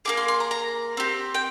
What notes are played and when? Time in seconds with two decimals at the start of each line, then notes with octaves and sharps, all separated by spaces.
0.05 A#3 D#4 G#4 D6
0.17 C6
0.28 C6
0.40 A#5
0.51 A#5
0.97 C4 G4
1.35 G5